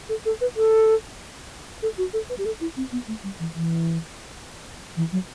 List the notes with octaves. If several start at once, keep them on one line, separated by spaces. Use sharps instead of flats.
A4
A4
B4
A4
A4
F#4
A4
B4
G4
A4
E4
C4
B3
A3
G3
E3
E3
E3
F#3